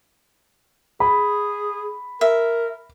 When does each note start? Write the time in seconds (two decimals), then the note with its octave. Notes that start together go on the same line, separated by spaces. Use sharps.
1.00 G#4 B5
2.21 A#4 E5